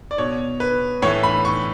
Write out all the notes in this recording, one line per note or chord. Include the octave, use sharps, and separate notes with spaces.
D5
B2 C#5
B4
A2 E3 C#5
B5
C#6